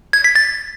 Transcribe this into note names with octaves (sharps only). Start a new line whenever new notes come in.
G#6
B6
A6